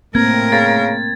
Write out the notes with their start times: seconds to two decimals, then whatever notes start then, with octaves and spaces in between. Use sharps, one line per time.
0.15 A2 A#3 C4 A#4 G#6
0.52 C#3 A6